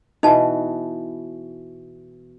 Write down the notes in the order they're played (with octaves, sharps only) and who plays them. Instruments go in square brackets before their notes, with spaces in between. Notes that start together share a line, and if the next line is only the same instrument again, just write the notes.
[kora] B2 E3 [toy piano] D#4 A5